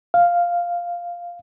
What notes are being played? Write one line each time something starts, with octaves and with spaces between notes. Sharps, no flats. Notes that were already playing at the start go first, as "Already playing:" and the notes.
F5